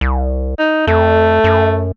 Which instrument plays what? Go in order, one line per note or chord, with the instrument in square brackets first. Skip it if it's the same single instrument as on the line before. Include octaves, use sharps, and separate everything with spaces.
[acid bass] C2
[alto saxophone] D#4
[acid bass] F2 [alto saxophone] A3
[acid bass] F#2